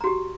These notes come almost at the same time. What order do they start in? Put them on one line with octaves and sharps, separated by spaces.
A#5 F#4 G4